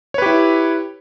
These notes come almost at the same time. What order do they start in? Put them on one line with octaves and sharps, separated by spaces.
C#5 B4 G4 E4